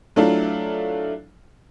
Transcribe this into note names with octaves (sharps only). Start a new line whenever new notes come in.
F#3 A3 D4 E4 F4